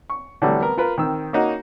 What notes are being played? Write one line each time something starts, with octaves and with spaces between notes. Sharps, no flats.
C#6
D3 E3 F#3 G3 A3
B3 A#4
F4 A#4 B4
D#3 C4 E6
A#3 C#4 D#4 F#4